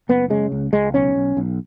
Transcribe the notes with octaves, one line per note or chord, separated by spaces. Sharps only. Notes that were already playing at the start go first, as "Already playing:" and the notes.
F#1 B3
C#3 G#3
C#2
C#2 G#3
B1 C#4
B1
B1